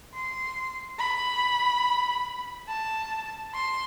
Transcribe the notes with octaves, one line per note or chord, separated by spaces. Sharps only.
C6
B5
A5
C6